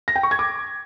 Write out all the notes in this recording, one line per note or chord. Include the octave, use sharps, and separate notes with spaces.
A#6
G5
C#6
G#6
D6